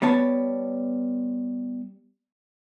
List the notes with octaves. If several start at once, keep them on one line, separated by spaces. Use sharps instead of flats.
G3 B3 C#5 A5